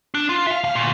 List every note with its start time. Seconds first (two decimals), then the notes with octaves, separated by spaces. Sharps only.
0.14 D4
0.29 F4
0.47 E5 F5
0.64 E2 F5
0.75 D2 A#2